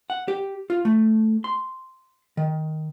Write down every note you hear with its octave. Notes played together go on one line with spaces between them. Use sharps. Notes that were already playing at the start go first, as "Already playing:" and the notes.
F#5
G4
F4
A3
C6
D#3